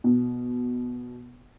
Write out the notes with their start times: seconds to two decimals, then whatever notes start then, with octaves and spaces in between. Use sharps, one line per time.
0.04 B2